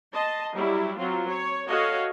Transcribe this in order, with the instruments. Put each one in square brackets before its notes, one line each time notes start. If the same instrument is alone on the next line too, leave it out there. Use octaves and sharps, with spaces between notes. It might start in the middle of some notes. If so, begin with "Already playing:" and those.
[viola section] D#5 A5 C6
F#3 G3 E4
F#3 C4 F4
C#5
F#4 A4 C#5 D#5 F5